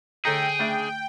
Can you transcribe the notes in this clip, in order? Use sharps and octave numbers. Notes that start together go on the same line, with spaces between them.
D3 A3 D#4 G#4 A4 G5 A#5
C#3 A3 D4 E5